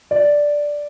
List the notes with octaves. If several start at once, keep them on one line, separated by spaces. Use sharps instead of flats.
D5